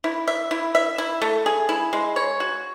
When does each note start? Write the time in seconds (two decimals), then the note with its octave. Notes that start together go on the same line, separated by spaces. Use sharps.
0.04 E4
0.28 E5
0.51 E4
0.75 E5
0.98 E4
1.22 A3
1.46 G#4
1.69 E4
1.93 G#3
2.16 C#5
2.40 F#4